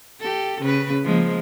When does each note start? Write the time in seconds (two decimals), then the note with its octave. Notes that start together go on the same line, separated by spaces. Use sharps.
0.21 G4 A4
0.61 C#3 B4
1.04 F3 G#3 A#3